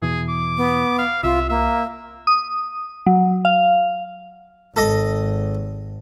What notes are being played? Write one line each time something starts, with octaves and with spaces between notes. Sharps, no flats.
E2 B2 E3 G#4
D6
B3
F5
C2 C3 F4 E5
A#3 E5
D#6
F#3
F5
G#1 A4 D#5